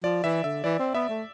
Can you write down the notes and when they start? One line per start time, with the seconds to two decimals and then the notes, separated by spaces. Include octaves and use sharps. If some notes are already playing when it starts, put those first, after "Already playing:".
0.03 F3 D5
0.24 E3 E5
0.44 D3 E5
0.64 E3 D5
0.79 C4
0.94 B3 E5
1.09 A3